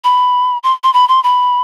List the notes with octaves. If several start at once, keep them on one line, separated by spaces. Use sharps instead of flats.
B5
C6
C6
B5
C6
B5